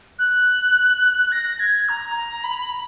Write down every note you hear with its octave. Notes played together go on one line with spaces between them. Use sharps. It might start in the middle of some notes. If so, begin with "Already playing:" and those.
F#6
A#6
G#6
A#5
A#5
B5